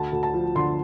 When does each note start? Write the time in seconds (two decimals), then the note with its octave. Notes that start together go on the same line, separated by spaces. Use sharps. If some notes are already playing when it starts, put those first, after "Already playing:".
Already playing: D2 A5
0.13 D2
0.23 A5
0.34 F3
0.56 D3 C6